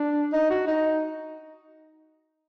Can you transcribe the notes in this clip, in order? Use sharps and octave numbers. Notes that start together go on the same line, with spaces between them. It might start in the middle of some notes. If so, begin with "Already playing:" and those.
Already playing: D4
D#4
F#4
D#4